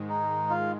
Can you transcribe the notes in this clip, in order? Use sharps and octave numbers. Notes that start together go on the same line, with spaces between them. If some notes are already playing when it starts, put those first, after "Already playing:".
Already playing: G#2 D#3 G#3
D#4
F4